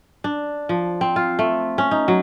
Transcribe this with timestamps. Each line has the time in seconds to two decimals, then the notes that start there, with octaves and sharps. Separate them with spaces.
0.24 D4
0.69 F3
1.01 C4
1.16 F4
1.39 A3
1.78 C#4
1.91 D#4
2.08 F#3